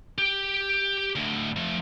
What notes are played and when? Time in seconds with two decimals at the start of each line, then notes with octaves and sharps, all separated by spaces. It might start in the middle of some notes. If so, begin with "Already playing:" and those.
0.18 G4 G5
1.16 D2 A2
1.56 F3 A3